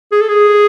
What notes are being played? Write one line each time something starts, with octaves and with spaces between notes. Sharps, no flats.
G#4
A4
G#4